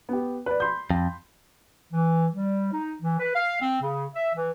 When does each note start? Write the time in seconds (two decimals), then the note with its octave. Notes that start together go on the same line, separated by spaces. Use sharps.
0.09 B3 G4
0.46 B4 D5
0.60 B5 C6 G6
0.90 F2
1.92 E3
2.33 G3
2.73 D#4
3.02 E3
3.19 B4
3.36 F5
3.61 C4
3.82 C#3
4.15 E5
4.35 E3